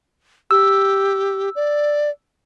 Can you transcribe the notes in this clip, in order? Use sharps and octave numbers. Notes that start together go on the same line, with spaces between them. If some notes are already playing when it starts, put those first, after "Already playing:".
G4 E6
D5